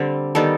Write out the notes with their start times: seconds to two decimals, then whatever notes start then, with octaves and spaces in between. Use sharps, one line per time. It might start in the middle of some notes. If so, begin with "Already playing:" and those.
Already playing: D3 G3 C4
0.35 D#3 G3 B3 A4